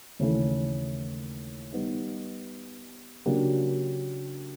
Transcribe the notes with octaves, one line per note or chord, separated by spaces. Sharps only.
D#2 C#3 E3 A3
G3 B3 D#4
C#3 F#3 A#3 D4 G4